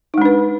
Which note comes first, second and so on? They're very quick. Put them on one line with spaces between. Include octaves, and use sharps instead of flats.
D#4 G#3 D4 B4